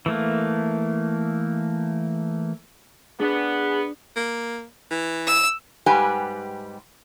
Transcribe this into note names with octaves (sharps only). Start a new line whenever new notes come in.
E3 A3 A#3
B3 D4 G#4
A#3
E3
E6
G#2 G3 G4 B4 G#5